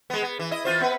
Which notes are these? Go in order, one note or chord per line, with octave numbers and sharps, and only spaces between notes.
G#3 B3
B3
E3
E4 D#5
E3 F4 C5
B3 B4